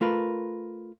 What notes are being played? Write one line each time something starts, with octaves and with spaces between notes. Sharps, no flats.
A3 F4 A#4 B4